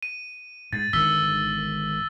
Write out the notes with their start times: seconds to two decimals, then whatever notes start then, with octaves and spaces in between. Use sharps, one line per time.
0.03 D#7
0.73 G#2 A6
0.93 G#1 D3 D#3 E6 B6 G7